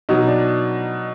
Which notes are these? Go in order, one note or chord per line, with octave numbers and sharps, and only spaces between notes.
B2 F#3 D#4
D4